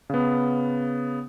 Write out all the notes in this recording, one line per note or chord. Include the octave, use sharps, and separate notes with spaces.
C#3 B3